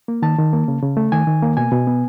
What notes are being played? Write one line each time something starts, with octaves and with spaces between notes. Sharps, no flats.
A#3
D#3 A5
D#3
A#3
C#3
C#3
A3
D#3 G#5
D#3
A#3
B2 G#5
B2
B3